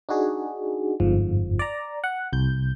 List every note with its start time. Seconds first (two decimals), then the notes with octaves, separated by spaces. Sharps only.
0.09 D4 D#4 F#4 G#4
1.00 G1 F2 G#2 F3
1.59 D5 A#5
2.04 F#5
2.33 C2 G6